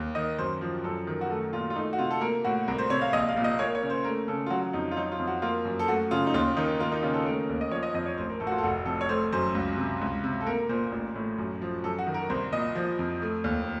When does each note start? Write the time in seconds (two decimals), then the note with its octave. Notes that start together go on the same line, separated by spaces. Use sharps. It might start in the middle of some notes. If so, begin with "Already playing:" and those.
Already playing: D#2
0.15 D#3 D#5
0.38 F#2 C5
0.61 F3
0.84 F#2 A4
1.07 D#3
1.21 F#4
1.30 A3 A4
1.53 A#2 F4
1.70 F4
1.76 A3 D#4
1.93 F#4
1.98 C3 F4
2.11 A4
2.21 A#3 A#4
2.44 A2 F#4
2.68 C2 A#4
2.78 C5
2.90 C3 C#5
3.01 F5
3.13 A#1 D#5
3.29 F5
3.37 A#2
3.44 D#5
3.59 A#3 C#5
3.75 C#5
3.83 C#3
3.90 C5
4.05 A3 A#4
4.28 C#3 A4
4.46 F4
4.50 F#3 F#4
4.73 F2 D#4
4.91 F4
4.97 F#3 D#4
5.12 F4
5.19 F2
5.27 F#4
5.42 A#3 F4
5.65 F#2
5.79 A4
5.88 A3 F#4
6.11 C#3 F4
6.27 D#4
6.34 D#2 F4
6.56 D#3 D#4
6.80 A#3 F4
6.92 D#4
7.03 C#3 F4
7.14 A4
7.25 A3 A#4
7.49 D#2
7.61 D#5
7.71 F3 C#5
7.83 D#5
7.94 F2 D#5
8.06 C#5
8.17 A1 C5
8.29 A#4
8.40 A2 A4
8.47 F#4
8.52 F4
8.58 A4
8.63 F1 F#4
8.86 F2 A4
9.01 C#5
9.09 A3 C5
9.32 F#2 C5
9.55 C#2
9.77 C3
10.01 C#2
10.24 C3
10.41 A4
10.46 A#3 A#4
10.69 A#2 C5
10.92 A1
11.15 A2
11.38 F#2
11.62 F3
11.84 F#2 A4
11.99 F#4
12.07 D#3
12.14 A#4
12.30 C2 C5
12.53 A#2 D#5
12.75 F3
12.99 F2
13.22 A3
13.44 D#2